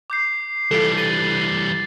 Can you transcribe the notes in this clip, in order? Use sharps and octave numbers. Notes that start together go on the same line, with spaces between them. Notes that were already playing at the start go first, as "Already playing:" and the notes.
D6 G6 C7
E3 G3 F4 G4 A4
A6 D#7